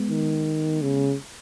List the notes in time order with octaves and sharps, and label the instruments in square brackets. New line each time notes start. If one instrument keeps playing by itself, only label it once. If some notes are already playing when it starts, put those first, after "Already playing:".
Already playing: [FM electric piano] G#3 B3
[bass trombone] D#3
C#3